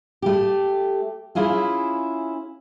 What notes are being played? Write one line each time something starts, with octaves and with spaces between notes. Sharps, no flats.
A3 G4
C#4 E4 F4 G#4 E5